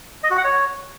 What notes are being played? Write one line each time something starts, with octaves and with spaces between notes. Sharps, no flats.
D#5
F#4
F#5
C#5